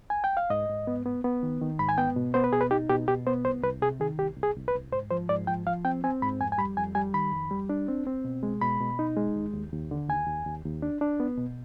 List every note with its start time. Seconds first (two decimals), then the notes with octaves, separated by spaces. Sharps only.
0.10 G#5
0.24 G5
0.37 F5
0.50 G#2 D#5
0.69 G#2
0.87 B3
1.05 B3
1.24 B3
1.43 D#3
1.61 D#3
1.79 G#2 B5
1.89 G#5
1.98 B3 G5
2.16 B2
2.34 B3 C5
2.44 B4
2.52 B2 G#4
2.61 B4
2.71 D#4 G4
2.90 B2 G4
3.08 B2 G4
3.27 B3 C5
3.45 C2 C5
3.63 C2 B4
3.82 C3 G#4
4.00 D#3 G#4
4.18 C2 G4
4.37 C2
4.43 G#4
4.56 C2
4.68 B4
4.74 C2
4.92 G#2 C5
5.10 F3 C5
5.29 G#2 D5
5.47 F3 G5
5.67 F3 F5
5.85 C4 G5
6.04 C4 G#5
6.22 G#2 B5
6.40 F2 G#5
6.52 G#5
6.58 G3 B5
6.76 F2 G#5
6.95 G3 G#5
7.14 D#3 B5
7.32 F2
7.51 G3
7.69 D4
7.88 C4
8.07 C4
8.25 B2
8.43 G#3
8.61 B2 B5
8.81 B2
8.99 D#4
9.17 G#3
9.36 D#2
9.54 D#2
9.72 D#2
9.91 D3
10.09 D#2 G#5
10.27 D#2
10.46 D#2
10.65 D#2
10.82 D4
11.01 D4
11.20 B3
11.38 B2